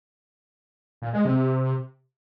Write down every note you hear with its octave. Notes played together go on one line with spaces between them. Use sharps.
A#2
G#3
C3